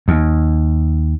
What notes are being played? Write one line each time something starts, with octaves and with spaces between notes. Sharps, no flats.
D#2